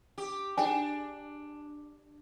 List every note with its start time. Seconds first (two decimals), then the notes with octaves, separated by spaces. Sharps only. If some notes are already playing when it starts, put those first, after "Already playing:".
0.18 G4
0.57 D4 G#4 G5 G#5